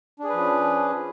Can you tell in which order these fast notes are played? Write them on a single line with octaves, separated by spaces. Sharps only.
D4 G#4 B4 F3 C#4